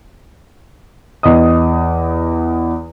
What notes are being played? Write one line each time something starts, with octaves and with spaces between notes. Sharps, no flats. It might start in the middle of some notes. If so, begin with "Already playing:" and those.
E2 D#5 D#6